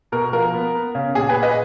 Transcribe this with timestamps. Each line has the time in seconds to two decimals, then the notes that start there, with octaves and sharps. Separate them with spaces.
0.12 B2 A#4
0.33 F3 A#4
0.54 B3
0.75 B3
0.95 C#3
1.15 A#2 G#4
1.29 G#4 B4
1.36 A#2
1.43 B4 D#5